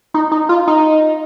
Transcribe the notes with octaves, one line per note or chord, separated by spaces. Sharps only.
D#4
D#4
F4
D#4